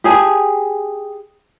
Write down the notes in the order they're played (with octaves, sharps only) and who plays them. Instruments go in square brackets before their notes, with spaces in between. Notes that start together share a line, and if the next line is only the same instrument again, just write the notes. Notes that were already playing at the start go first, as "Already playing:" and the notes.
[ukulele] G4 G#4 G#5 A5